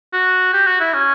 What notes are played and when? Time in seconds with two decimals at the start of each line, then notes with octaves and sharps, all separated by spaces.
0.13 F#4
0.53 G4
0.67 F#4
0.80 E4
0.94 C#4